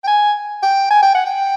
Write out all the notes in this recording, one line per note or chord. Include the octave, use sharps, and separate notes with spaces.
G5
G#5
G5
G#5
G5
F#5
G5